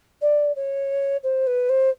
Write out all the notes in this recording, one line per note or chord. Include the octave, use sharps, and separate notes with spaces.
D5
C#5
C5
B4
C5